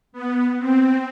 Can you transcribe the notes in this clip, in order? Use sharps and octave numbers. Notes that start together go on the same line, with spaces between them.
B3
C4